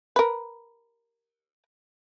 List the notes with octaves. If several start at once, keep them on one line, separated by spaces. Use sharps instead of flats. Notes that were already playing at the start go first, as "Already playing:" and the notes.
A#4 B4